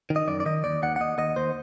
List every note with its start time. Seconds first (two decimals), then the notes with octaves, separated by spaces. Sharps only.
0.10 D#3
0.16 D#5
0.28 F#2 D5
0.40 D5
0.46 D#3 D#5
0.64 D#2 D5
0.83 D#2 F#5
0.96 F#5
1.00 D#2 D#5
1.18 D#2 D#5
1.36 D#2 C5